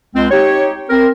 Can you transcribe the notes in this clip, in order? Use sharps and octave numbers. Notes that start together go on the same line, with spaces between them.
C#2 G#3 C4
D#4 G4 C#5
C4 A#4